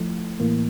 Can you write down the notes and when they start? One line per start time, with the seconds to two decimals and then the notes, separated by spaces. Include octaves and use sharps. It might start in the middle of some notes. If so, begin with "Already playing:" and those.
Already playing: F3 A3 E4
0.40 A2 E3 A#3